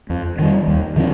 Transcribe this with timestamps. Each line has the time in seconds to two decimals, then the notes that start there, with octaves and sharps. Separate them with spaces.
0.10 F2
0.39 D#3 G3
0.67 D#2
0.96 D3 F3 C4